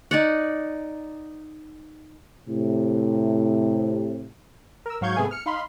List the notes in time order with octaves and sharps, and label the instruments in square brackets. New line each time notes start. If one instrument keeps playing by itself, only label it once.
[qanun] D#4 D5 F#5
[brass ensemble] A2 C3
[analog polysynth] A#4 E6
G#2 F#3 F5 C#6 G6 G#6
G#2 C3 A3 B3 G#4 G#5
F6 C#7
D#4 F5 B5 C6